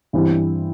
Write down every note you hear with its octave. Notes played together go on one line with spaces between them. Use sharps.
G2 E3 G3 C4 E4